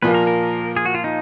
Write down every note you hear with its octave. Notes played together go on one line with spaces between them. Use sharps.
A#2 F3 A#3 F4 B4
A#4
A#4
G#4
F#4
F4
D#4